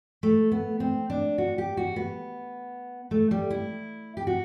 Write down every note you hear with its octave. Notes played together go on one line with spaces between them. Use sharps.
A3
B3
C4
D4
F#4
G4
F#4
B3
A3
G3
E4
G4
F#4